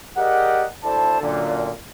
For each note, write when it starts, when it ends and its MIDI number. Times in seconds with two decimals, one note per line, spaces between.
0.17 0.65 67
0.17 0.65 68
0.17 0.65 70
0.17 0.65 74
0.17 0.65 75
0.17 0.65 78
0.84 1.19 38
0.84 1.19 64
0.84 1.19 69
0.84 1.19 72
0.84 1.19 74
0.84 1.19 81
1.22 1.71 42
1.22 1.71 46
1.22 1.71 50